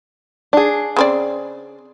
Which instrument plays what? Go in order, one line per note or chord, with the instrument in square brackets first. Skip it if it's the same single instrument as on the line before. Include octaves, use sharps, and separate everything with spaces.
[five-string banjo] D4 G#4
[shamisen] C#3 C4 D5